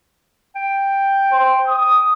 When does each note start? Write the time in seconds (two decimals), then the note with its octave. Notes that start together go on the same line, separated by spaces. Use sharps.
0.56 G5
1.33 C5
1.67 D#6